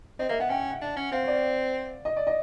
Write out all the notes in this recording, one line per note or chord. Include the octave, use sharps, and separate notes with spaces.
C4 D#5
A#3 E5
B3 F#5
C#4 G5
F#5
D4
C#4
C4 F5
C#5
D5
D#5
D5
D#5